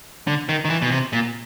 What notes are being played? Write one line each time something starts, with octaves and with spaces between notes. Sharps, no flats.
D3
D#3
D#3
E3
B2
C3
A#2